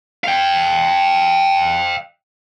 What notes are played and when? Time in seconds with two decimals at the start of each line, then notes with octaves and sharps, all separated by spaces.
0.24 F5 G5